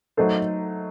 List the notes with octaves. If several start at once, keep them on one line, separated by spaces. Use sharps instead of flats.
F#3 A3 D#4 A4 C5